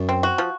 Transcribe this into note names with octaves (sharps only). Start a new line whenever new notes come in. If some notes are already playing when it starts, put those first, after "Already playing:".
Already playing: F#2
C4
F#4
F3